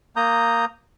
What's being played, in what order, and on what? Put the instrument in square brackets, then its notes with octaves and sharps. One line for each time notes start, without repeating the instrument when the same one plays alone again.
[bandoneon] A#3 A#5 D#6 G6